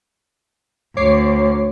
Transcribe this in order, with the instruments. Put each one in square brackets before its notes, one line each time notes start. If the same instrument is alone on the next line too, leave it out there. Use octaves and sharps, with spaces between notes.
[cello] D2 [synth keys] C#5 D6 C7